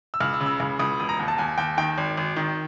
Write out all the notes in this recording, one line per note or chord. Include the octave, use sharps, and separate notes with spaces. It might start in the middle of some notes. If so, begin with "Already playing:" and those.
E6
C#2 F6
E6
C#3
E6
C#2
C#2 D#6
E1 D#6
A#5
D#2
A5
D#2 G#5
D#2 G5
D#3 G5
G#1
G#1
D#3